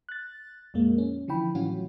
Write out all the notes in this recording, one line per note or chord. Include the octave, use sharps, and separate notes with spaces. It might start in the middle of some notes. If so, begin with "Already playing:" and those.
F#6 A6
F2 A#2 G#3 A#3
C#4
D3 E3 F3 E4 G5 B5
A2 E3 F#3 C#4 F4 F#4